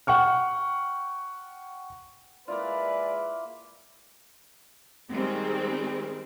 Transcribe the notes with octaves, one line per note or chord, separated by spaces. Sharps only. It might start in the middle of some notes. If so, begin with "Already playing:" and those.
F#5 G5 C#6 F6
G#3 A#3 E4 F4 B4 D5
D#3 G3 G#3 C4